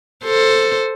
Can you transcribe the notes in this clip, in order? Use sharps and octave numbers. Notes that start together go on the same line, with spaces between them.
A4 C5